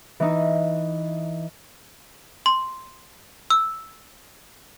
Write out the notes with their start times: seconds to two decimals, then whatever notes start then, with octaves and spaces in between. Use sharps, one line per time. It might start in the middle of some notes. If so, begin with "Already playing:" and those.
0.20 E3 D#4
2.46 C6
3.50 E6